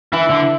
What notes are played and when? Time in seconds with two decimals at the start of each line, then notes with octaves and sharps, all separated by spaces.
0.13 E3 E4
0.29 D3